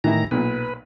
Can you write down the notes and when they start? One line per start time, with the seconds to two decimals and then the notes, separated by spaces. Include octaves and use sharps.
0.04 A2 D#3 E3 E4 A#5
0.31 B1 A#2 B4